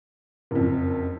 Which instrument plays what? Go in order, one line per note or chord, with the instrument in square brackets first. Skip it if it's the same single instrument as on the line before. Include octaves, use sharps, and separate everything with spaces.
[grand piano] F#1 F2